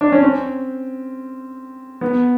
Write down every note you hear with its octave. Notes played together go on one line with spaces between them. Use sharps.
D4
C#4
C4
B3